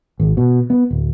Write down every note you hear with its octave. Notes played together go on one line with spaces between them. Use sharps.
G#1
B2
B3
D1